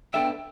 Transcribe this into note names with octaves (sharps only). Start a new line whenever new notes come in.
B3 D4 A4 E5 G5